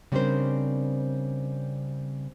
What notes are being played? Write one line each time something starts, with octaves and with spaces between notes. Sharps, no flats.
C#3 G3 C4 D4 A#4 C5